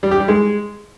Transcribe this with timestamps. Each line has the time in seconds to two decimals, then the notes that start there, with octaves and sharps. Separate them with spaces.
0.03 G3
0.11 G4
0.20 G3
0.28 G#3